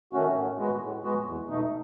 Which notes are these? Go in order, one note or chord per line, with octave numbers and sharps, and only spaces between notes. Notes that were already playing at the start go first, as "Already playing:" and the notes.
D#3 A3 C#4 F#4
A2
G#3 B3 F#4
A2
G#3 B3 F#4
E2
B2 A3 D#4